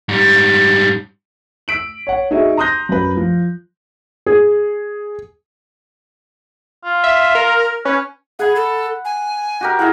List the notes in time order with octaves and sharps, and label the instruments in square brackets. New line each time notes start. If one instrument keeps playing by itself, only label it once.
[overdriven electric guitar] G#2 G3
[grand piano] E6 B6 D7 F#7
C#5 F#5
D#4 F#4 G#4 D#5 E5
A#5 C6 D#6 F#6 G6 A#6
F#2 B4
F3
[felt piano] G#4
[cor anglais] F4
[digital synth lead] E5
A#4
[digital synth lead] C#4 [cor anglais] B4
[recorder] G#4 [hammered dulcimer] F#5 B5
[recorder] A4
G#5
[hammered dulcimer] F#4 G4 A#4
[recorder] E4 [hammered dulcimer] G#4 F#5